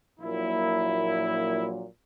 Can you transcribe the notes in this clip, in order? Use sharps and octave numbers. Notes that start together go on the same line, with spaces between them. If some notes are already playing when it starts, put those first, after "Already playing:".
A#1 A#2 F#3 A#3 E4